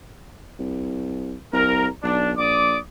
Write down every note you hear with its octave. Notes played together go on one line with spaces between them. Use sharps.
C2
C2 A#4
B1 D4
A#1 D5 D6 D#6